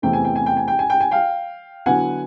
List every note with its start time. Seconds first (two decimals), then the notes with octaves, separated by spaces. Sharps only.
0.02 E2 C3 E3 A3 C4 G5
0.13 G#5
0.24 G5
0.36 G#5
0.46 G5
0.57 G#5
0.68 G5
0.79 G#5
0.90 G5
1.00 G#5
1.11 F5 G5
1.86 D3 F#3 B3 E4 F#5 G#5